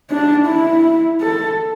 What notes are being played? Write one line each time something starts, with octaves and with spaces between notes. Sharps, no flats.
D4
E4
A4